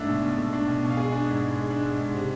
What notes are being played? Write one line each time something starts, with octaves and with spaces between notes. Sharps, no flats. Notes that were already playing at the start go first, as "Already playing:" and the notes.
Already playing: G#2 A3 D4 A4
B2
B2
A3
D4
B2
B2
F5
G#3 G#4 G#5
D4
G#2
G#2
G#3
D4
G#2
G#2
C3